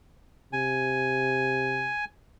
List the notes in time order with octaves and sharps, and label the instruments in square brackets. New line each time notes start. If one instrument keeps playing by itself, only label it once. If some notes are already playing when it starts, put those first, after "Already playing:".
[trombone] C3 [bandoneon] G#5